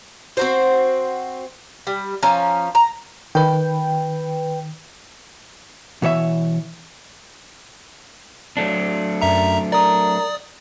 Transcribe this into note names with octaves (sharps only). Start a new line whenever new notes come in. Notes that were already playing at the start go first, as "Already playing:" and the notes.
C4 F#4 C5
G3
F3 C#4 G#5 A#5
A#5
D#3 B4 G5
B2 E3 C#5 E5
F#3 A3 D4
F#2 E5 A#5
A#4 D5 D#6